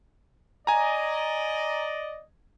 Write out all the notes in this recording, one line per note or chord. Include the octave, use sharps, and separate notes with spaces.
D5 D#5 G#5 A#5